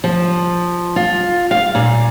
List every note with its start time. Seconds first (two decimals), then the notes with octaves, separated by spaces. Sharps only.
0.04 F3
0.96 F4
1.51 F5
1.75 A#2